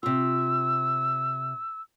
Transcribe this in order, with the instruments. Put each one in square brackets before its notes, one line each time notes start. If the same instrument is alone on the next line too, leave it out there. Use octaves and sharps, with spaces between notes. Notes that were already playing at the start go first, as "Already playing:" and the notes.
[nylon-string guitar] C3 F4 [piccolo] E6